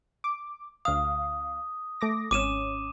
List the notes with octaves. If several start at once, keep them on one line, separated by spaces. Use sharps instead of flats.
D6
D2 F5 D#6
A3 D6 A#6
G#1 C#4 D6 D#7 E7